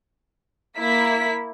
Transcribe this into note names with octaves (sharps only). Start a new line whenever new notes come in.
A#3 E4 B6